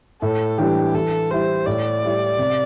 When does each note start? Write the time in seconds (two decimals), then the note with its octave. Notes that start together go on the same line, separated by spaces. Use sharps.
0.22 A2 A4
0.58 E3 G3 D4 G4
0.94 E3 A4
1.31 G3 E4 C5
1.66 A2 D5
2.03 G3 E4
2.39 C3